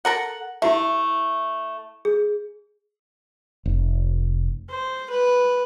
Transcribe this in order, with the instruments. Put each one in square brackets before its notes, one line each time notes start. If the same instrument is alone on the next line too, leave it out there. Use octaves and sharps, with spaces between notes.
[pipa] A4 A#4 F#5
[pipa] A3 [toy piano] E4 G4 E5
[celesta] G#4
[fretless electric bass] F1
[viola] C5
B4